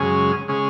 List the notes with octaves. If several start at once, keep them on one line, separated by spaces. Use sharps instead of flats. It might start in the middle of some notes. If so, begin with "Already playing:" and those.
Already playing: F#2 C#3 G#3 C#4 G#4
C#3 G#3 C#4 G#4